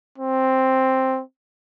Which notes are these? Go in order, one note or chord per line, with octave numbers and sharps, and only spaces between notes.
C4